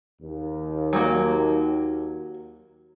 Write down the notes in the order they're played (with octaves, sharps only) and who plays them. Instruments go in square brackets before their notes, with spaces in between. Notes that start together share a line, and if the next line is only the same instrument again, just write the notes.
[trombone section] D#2
[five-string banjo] F#3 G3 A#3